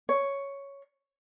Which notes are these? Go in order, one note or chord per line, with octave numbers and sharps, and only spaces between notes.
C#5